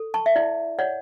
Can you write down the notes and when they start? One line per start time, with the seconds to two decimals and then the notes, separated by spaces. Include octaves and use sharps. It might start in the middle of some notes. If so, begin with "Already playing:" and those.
Already playing: A4
0.14 A5 C#6
0.26 E5
0.36 E4 D5
0.79 C#5 D5 F#5